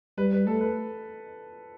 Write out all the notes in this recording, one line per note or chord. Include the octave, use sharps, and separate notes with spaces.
G3 B4
B4
A3 A4
B4